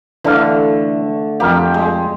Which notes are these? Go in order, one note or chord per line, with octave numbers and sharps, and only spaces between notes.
D3 E3 A3 D4 F5
F2 G4 A#4 F5
G#3